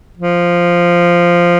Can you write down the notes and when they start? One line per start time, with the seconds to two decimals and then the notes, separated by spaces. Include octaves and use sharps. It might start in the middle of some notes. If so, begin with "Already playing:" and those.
0.17 F3